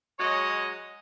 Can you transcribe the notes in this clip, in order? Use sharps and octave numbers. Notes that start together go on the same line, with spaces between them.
F#3 G#3 C#5 D#5